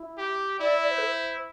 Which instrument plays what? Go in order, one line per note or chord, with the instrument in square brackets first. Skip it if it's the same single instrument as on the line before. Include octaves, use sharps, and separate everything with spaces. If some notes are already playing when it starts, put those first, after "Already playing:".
Already playing: [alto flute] E4
[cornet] G4
[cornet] E4 [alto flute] D5
[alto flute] D5
C5
A4
C5